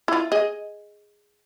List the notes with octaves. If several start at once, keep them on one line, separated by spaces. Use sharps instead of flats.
E4 F4
G#4 D#5